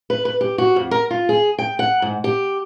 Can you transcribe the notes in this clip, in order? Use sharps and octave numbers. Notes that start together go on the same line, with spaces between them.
B4
B4
G4
F#4
F2
A#4
F4
G#4
G5
F#5
G#2
G4